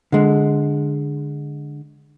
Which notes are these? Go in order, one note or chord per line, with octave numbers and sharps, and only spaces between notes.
D3 G#3